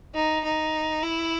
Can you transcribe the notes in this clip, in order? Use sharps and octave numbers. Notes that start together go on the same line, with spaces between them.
D#4
D#4
E4